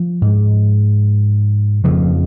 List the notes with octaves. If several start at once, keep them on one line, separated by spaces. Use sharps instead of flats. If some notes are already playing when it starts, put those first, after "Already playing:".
Already playing: F3
G#2
F2 C#3 F3